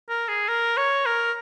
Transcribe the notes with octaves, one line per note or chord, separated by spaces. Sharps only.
A#4
G#4
A#4
C#5
A#4